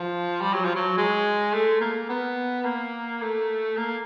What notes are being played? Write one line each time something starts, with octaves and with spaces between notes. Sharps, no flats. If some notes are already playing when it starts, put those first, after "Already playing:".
Already playing: F3
G3
F#3
F3
F#3
G#3
A3
A#3
B3
A#3
A3
A#3